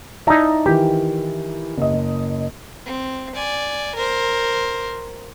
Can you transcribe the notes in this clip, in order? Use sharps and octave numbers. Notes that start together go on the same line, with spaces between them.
D#4 E4 D5 A5 A#5
D#3 E3 G4
F#1 D#5
C4
D5 G#5
A#4 C5